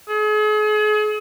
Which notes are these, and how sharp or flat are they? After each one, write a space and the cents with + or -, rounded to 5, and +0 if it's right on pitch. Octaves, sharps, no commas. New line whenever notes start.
G#4 +40